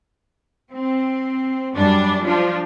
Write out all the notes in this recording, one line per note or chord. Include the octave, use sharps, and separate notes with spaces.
C4
F#2 G3 D4
F3 D4